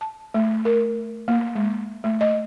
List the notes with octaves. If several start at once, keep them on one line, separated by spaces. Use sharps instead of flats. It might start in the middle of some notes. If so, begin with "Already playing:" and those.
A5
A3
A#4
A#3
G#3
A3
D#5